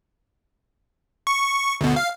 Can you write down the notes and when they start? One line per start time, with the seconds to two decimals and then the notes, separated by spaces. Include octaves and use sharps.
1.27 C#6
1.81 D2 B2
1.96 F5